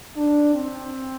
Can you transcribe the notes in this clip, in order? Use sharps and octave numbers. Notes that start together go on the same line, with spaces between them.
D4
C4